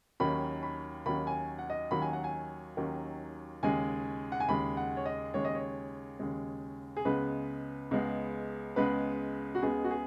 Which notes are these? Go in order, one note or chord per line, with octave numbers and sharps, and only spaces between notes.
D#2 D#3 F#3 C#4 B5
B5
D#2 D#3 F#3 C#4 B5
G#5
F#5
D#5
D#2 D#3 F#3 C#4 B5
G#5
F#5
G#5
D#2 D#3 F#3 C#4
D#2 C#3 G#3 G#5
F#5
G#5
D#2 C#3 G#3 B5
F#5
C#5
D#5
D#2 C#3 G#3 C#5
D#5
C#5
D#2 C#3 G#3
G#4
C#2 C#3 G#3 B3 B4
C#2 C#3 G#3 B3
C#2 C#3 G#3 B3 B4
F#4
C#2 C#3 G#3 B3 G#4
F#4
G#4